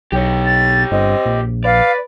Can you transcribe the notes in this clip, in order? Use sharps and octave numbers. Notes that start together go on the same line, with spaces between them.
B1 G4 C#5
A6
G1 C4 D#5
A#1
B4 D5 F5